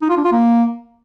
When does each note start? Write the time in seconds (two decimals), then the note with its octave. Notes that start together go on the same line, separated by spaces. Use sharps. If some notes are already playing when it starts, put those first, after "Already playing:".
0.02 D#4
0.09 F4
0.17 D4
0.24 F4
0.32 A#3